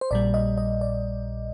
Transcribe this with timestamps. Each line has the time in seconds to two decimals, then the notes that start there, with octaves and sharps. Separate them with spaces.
0.01 C5
0.11 A#1 A#2 G3 D5
0.34 D#5
0.57 D#5
0.81 D5